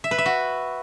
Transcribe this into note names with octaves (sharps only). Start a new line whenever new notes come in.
E5
B4
E5
F#4